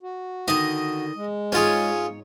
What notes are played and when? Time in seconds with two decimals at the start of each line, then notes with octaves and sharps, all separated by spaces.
0.03 F#4
0.48 D3 D#3 D#5
1.16 G#3
1.52 G#2 C#4 F4 G#4 C#5